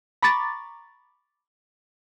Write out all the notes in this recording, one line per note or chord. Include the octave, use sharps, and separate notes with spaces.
A#5 B5 C#6 D6 A6